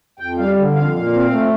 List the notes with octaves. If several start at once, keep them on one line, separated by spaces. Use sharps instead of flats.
F2 G5
G3 F5
D3
F2 F5
A#2
C4
A3